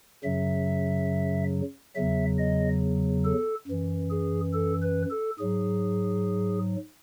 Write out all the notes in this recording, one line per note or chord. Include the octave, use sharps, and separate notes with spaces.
F#2 C#3 F#3 E5
E2 C#3 F#3 E5
D#5
A4
F#2 E3
G#4
A4
B4
A4
G#2 F#3 G#4